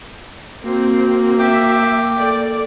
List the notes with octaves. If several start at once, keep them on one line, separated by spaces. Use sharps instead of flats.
A#3 C4 F#4
E5 G5 D6
A4 D5